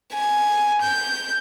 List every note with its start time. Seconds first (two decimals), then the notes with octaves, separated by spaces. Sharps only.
0.14 G#5
0.82 G6